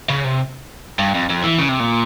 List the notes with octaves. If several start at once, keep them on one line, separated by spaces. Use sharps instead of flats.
C#3
C3
G2
F2
F2
E3
C#3
C3
A#2